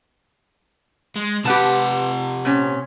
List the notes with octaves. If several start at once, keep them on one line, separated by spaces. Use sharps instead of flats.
G#3
C3 G4 B4 F#5 A5
A#2 C#4